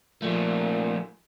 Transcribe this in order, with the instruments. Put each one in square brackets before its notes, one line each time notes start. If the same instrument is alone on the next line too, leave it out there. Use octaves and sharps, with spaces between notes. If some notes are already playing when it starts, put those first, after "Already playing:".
[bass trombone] A#2 [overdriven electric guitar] F3 A3